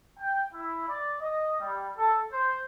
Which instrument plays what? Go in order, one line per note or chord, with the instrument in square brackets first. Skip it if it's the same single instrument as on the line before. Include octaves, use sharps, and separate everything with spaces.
[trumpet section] G5
E4
D5
D#5
G3
A4
C5